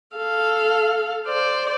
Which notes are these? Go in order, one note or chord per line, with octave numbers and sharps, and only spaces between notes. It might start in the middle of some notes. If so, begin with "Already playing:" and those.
A4 F5
C5 D5